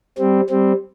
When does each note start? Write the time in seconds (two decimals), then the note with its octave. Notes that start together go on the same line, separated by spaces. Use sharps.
0.18 G3 C4
0.50 G3 C4